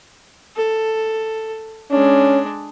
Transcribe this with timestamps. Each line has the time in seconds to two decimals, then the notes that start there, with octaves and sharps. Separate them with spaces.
0.56 A4
1.91 G#3 C#4 D4